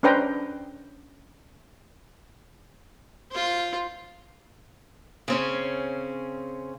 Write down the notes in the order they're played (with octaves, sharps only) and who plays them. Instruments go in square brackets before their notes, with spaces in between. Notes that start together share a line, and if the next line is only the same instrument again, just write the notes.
[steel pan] C#4 D4 B4 C5 G5 A#5
[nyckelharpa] F4 C5
[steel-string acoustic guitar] C#3 C4 C#4